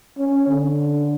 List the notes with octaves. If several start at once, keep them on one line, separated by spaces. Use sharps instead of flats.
C#4
D3